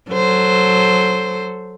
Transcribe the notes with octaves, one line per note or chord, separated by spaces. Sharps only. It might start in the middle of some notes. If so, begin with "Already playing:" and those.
F#3 A4 C5